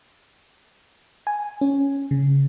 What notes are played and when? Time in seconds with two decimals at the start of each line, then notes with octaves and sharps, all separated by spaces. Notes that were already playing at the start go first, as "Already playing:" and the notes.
1.27 G#5
1.61 C#4
2.11 C#3